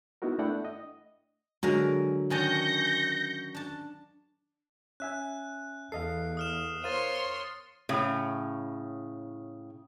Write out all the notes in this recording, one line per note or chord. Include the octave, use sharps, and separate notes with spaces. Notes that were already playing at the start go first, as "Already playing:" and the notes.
B3 D#4 E4 F#4 A#4
A3 D4 E4 D5 F#5 G5
D#5
D3 F#3 G#3 A#4
D#3 C#4 D4 G6 A#6 C#7
D4 A5
C#4 E5 G#5 F#6
E2 A4 D#5 F5 C7
D#6 F6 E7
A#4 C5 C#5 F5 C6 A6 D#7
A2 C#3